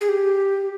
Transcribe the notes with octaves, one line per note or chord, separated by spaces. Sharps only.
G#4
G4